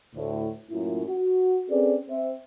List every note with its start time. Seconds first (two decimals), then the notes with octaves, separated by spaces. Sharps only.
0.15 D2 A2
0.70 F#2 A2 F#3 A#3 E4 F4
1.07 F#4
1.69 C4 C#4 G#4 A4 B4 D5
2.09 C4 C5 E5